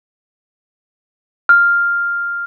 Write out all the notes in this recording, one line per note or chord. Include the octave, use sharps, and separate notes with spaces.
F6